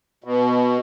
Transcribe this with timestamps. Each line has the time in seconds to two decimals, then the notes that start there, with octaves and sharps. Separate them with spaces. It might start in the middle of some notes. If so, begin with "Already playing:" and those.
0.24 B2